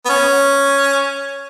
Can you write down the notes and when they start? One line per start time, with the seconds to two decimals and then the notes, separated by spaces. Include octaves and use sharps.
0.06 B3
0.09 C#4